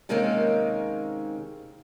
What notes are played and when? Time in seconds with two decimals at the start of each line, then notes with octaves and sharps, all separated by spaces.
0.09 C3 D#3 G#3 A#3 C4 C#4